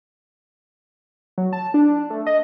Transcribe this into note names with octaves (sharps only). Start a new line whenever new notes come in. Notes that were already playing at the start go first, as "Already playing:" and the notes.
F#3
A5
D4
A3
D#5